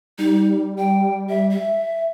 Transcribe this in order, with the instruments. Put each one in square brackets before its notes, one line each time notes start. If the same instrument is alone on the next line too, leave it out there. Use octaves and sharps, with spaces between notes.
[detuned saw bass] G3 [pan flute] D#4
[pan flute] G5
E5
E5